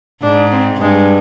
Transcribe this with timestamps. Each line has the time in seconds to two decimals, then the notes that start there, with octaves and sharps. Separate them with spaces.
0.23 G#2 D4
0.52 C4
0.81 G2 G#3